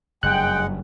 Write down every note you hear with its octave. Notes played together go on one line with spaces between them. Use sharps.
F#1 G2 G#3 F#5 G5 F#6